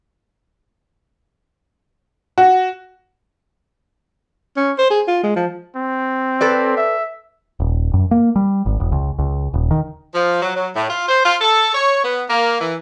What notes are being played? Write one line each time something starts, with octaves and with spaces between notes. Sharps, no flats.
F#4
C#4
C5
G#4
F4
G#3
F3
C4
A4 B4 D5
E5
D#1
F#2
A#3
G3
G#1
E1
C#2
C#2
D#1
D#3
F3
F#3
F#3
A2
F4
C5
F4
A4
C#5
B3
A#3
E3